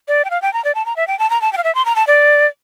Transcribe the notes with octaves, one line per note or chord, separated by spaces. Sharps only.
D5
G5
F5
G5
A#5
D5
A5
A#5
E5
G5
A5
A#5
A5
G5
F5
E5
C6
A#5
A5
D5